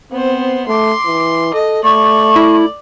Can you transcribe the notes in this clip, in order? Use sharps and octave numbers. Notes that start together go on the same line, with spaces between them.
B3 C4 C5
A3 C6 D6
E3
A4 D#5
A3 D5 C#6
E4